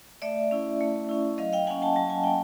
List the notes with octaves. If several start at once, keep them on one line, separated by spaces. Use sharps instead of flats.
A3 D5 E5
C#4 E4
A3
C#4 E4
F#3 D#5 F5
F5 G5
A#3 C#4 F#5 G#5
G5 A5
F#3 A5
G#5
A#3 C#4 G5